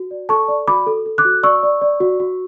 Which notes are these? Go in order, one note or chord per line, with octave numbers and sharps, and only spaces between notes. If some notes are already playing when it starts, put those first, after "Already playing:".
Already playing: F#4
D5
A4 A5 C#6
D5
F#4 B5 D6
A4
A4
D6 F#6
F#4
D5 C#6 E6
D5
D5
F#4
F#4